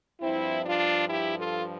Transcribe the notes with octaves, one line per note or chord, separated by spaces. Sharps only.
G2 F3 C4 E4
D4 F4
E4 G4
F4 A4